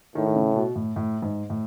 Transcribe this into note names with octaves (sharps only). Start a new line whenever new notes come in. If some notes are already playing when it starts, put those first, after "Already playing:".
A2 D#3
D#3
C#3
B2
A2
A2
G#2
A2